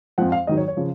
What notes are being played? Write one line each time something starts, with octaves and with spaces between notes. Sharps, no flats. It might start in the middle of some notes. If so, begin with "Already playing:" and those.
F2 F3 F#5
F5
G#2 D#3 F#3 D#5
C#5
C#5
C#3 F3